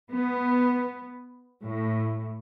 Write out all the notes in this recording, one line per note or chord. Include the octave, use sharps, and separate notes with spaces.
B3
A2